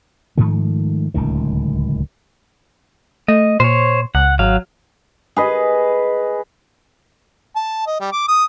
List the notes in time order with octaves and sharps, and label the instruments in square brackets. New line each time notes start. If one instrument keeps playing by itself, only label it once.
[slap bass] G#2 D#3 F3 A3
D1 C#2 D#3
[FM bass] A3 [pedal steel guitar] D#5
[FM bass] A#2 [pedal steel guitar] C5 C#5
[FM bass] C#2 [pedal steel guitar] F#5
[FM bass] G#1 [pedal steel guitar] F#3 F5
[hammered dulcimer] G#4 B4 D#5
[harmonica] A5
D#5
G3
D6
D#6